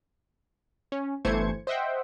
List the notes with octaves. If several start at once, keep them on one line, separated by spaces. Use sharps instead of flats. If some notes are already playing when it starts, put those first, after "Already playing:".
C#4
G1 E3 A3 C5 G#6 C#7
C5 D#5 E5 F#5 G5